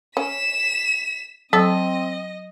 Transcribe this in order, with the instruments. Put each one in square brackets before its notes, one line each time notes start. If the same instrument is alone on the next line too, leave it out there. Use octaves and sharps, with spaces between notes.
[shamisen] C#4 [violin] B6 E7
[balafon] F#3 [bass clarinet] C4 [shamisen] A4 [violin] D#5